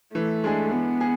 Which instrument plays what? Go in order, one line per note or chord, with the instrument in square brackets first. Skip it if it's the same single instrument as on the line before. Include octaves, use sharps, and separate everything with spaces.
[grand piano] E3 [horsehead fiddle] A3
[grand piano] G#3 D4 G#4
[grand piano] E3 [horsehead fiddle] B3
[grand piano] G#4